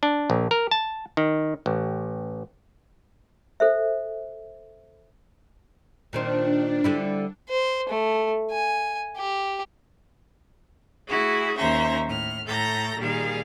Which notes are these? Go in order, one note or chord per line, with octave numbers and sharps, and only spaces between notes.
D4
A#1
A#4
A5
D#3
A1
A4 C5 E5
A#2 D#3 C4 D4
D3 G3 E4
C5
A3
G#5
G4
A3 E4 F#4 G#4
D#2 A#3 C#4 C5 E5 A#5
A2 F6
A2 A4 A#5 G6 A#6
A#2 D#3 G3 G#4 F5